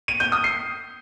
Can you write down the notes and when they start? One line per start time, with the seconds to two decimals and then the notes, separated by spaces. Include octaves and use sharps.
0.08 D#7
0.20 G6
0.32 D#6
0.44 C7